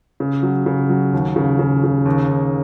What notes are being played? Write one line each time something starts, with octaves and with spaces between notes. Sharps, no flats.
C#3
F#3
C#3
F#3
D#2
C#3
C#3
C#3
D#2
D#2